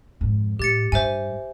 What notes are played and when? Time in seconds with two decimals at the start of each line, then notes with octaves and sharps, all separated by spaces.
0.21 F2 G#2
0.59 A2 G4 A6 C#7
0.92 G2 C5 E5 G#5